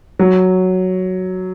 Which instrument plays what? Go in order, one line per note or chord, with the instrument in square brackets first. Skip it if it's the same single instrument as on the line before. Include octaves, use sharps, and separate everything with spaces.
[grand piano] F#3